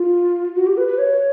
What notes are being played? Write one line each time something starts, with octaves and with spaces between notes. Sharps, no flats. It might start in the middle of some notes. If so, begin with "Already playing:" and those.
Already playing: F4
F#4
G4
B4
B4
C#5